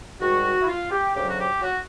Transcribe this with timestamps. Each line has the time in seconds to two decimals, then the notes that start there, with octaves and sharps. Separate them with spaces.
0.20 G#2 D#3 G3 F#4
0.61 E4
0.67 F4
0.91 G4
1.14 D2 C#3 F#3 G4
1.29 F#4
1.38 G4
1.62 F#4